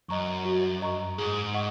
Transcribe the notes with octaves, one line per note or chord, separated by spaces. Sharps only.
F#2 D#5 A#5 C#6
F#4
D#5 A#5 C#6
G#2 G#4
D#5 F#5 C#6